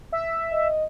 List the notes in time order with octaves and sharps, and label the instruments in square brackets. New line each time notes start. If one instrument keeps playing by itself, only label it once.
[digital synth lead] E5
[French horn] D#5